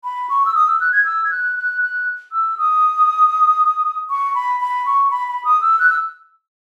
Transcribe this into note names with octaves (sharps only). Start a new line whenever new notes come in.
B5
C#6
E6
D#6
E6
F#6
G#6
E6
G#6
F#6
F#6
F#6
E6
D#6
C#6
B5
B5
C#6
B5
B5
D#6
E6
F#6
E6